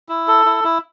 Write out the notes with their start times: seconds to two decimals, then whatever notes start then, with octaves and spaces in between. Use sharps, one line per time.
0.09 E4
0.28 A4
0.46 E4
0.64 E4